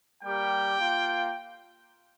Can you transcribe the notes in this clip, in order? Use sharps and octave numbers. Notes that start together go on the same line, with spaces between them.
G3 A#3 G4 G5
A#3 F4